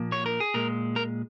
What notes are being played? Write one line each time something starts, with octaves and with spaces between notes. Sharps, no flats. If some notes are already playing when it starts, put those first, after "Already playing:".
Already playing: A#2 F3 A#3
C#5
A#4
G#4
A#2 G#3 A#4
A#4